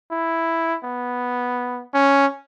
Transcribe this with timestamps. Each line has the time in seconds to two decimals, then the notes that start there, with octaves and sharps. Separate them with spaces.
0.11 E4
0.84 B3
1.94 C#4